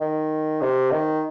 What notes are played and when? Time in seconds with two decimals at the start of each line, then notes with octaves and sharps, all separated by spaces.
0.01 D#3
0.61 C3
0.92 D#3